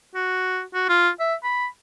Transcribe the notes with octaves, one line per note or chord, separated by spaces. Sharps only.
F#4
F#4
F4
E5
B5